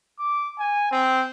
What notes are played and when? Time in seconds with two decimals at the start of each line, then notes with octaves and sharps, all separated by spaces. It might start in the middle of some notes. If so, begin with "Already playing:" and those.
0.19 D6
0.59 G#5
0.91 C4